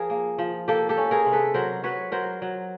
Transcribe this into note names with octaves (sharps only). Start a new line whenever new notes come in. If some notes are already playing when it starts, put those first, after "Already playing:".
Already playing: F3 G#4 A#4
A#3
F3
A#3 G4 A4
G4 A4
C#4
G#4 A#4
C3
A4 B4
F#3 A#4 C5
F#3 B4 C#5
F#3 A#4 C5
F#3